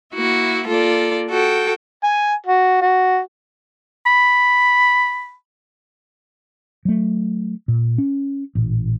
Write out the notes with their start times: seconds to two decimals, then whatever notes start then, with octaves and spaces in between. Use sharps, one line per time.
0.14 A#3 E4 F#4
0.67 A#3 F4 A4 D5
1.29 F#4 A4 G5
2.03 G#5
2.46 F#4
2.82 F#4
4.06 B5
6.85 F#3 A3
7.68 A#2
7.98 C#4
8.55 A1 A#2